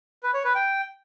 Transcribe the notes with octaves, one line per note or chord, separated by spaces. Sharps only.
B4
C#5
B4
G5